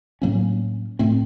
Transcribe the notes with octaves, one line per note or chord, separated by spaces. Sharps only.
A2 F#3 A#3 C#4
A2 A3 C4